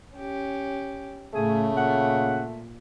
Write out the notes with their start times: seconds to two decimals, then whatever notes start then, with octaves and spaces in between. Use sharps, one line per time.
0.15 C#4 G4
1.34 A2 C#3 A3 G#4
1.77 A#2 F#5